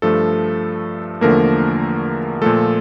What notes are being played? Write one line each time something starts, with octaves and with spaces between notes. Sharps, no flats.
G2 F3 A3 A4
E2 D3 F3 A3 A#3 A#4
A#2 F3 A3 A4